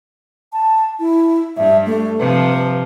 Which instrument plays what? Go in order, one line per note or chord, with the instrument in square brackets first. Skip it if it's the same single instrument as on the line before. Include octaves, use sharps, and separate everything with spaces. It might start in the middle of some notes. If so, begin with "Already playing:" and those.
[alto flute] A5
E4
[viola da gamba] G2 [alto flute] E5
[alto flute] A3
[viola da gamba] C3 F3 [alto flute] B4